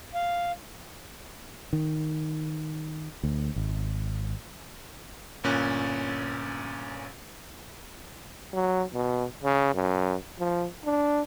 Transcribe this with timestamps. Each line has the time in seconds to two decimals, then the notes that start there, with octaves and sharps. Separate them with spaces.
0.15 F5
1.73 D#3
3.23 D2
3.56 G#1
5.44 G1 A#2 C#4 F#6 A6
8.53 F#3
8.93 B2
9.43 C#3
9.74 F#2
10.39 F3
10.85 D4